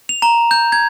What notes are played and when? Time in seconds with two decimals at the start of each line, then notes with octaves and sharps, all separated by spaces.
0.09 F7
0.22 A#5
0.51 G6
0.72 G#6